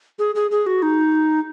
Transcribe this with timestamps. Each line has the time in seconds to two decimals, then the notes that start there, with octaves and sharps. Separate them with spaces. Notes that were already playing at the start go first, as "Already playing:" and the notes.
0.19 G#4
0.35 G#4
0.51 G#4
0.66 F#4
0.82 D#4